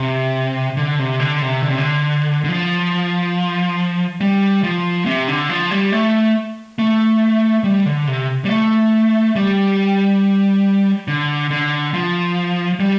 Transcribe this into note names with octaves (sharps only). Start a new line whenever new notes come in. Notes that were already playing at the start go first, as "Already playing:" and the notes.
Already playing: C3
D3
C3
D3
C3
D3
C3
D3
D3
F3
G3
F3
C3
D3
F3
G3
A3
A3
G3
D3
C3
G3
A3
G3
D3
D3
F3
G3